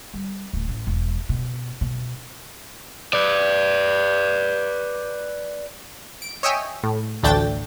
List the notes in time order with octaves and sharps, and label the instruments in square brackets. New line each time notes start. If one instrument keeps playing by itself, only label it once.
[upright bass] G3
D1
A1
E1
B2
B2
[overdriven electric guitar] B4 D5
[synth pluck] D7
C#5 D#5 E5 G5 G#5
A2
A1 D2 A3 D4 G5 A6